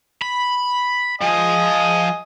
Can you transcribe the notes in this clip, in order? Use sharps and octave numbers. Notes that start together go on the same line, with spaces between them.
B5
F3 D#5 G#5 D#6